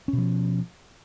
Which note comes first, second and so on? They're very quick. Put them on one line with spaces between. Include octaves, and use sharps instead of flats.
C#4 B2 F3